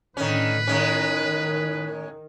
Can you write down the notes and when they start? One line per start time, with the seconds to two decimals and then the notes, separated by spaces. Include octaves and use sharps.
0.17 A2 D3 D#3 C#4 B4
0.67 A2 D#3 G#3 C#4